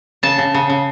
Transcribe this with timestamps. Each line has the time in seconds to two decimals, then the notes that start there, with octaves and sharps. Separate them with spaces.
0.23 C#3 A5
0.38 C#3
0.54 C#3
0.70 C#3